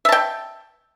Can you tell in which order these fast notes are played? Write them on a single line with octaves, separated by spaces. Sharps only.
E5 A5 G5